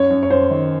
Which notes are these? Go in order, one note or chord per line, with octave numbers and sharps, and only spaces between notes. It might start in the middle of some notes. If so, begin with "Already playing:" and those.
Already playing: F#2 C#5
F#2
C#5
F#2 C5
D#3